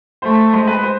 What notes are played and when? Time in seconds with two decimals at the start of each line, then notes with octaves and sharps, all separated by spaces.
0.22 A3 C5
0.53 G#3 C5
0.67 B4
0.83 C5